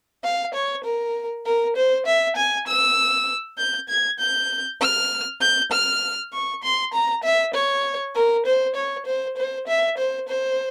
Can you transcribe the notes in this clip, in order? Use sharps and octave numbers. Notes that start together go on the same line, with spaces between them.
F5
C#5
A#4
A#4
C5
E5
G#5
E6
G6
G#6
G6
F6
G6
F6
C#6
C6
A#5
E5
C#5
A#4
C5
C#5
C5
C5
E5
C5
C5